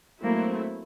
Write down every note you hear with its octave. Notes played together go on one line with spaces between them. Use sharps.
F#3 A3 A#3 C4 E4